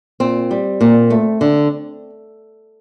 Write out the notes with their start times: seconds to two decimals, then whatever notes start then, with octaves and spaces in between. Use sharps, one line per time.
0.20 A#2 C4
0.51 G3
0.81 A#2
1.10 A3
1.41 D3